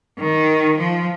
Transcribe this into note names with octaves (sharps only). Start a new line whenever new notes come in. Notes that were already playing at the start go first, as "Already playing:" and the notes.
D#3
F3